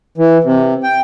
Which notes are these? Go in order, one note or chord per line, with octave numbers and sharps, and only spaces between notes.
E3
C3
G5